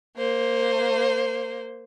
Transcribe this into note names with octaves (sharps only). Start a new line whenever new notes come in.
A#3 C5